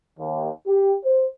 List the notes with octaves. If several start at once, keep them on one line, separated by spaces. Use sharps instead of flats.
D#2
G4
C5